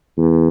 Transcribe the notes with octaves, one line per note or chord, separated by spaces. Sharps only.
E2